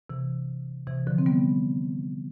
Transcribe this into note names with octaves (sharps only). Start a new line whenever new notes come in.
C3 E3
C3 E3
D3 F3
C4
G3 B3